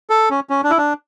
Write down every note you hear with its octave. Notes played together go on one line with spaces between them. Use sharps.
A4
C#4
C#4
D4
E4
D4